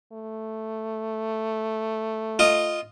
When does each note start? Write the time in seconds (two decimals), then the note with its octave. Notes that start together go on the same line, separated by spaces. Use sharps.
0.12 A3
2.39 F4 D#5